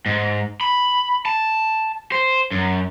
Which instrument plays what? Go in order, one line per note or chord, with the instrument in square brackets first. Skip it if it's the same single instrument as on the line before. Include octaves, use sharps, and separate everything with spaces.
[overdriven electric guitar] G#2
B5
A5
C5
F#2